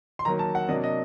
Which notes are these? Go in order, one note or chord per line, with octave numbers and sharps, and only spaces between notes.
C6
D#3 F#3 A#3 A#5
A5
F#5
C3 F#3 A#3 D4 D#5
D#5